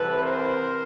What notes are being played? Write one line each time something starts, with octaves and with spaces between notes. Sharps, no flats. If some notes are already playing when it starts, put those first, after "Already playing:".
Already playing: C2 C3 E3 A4 B4
A#4 C5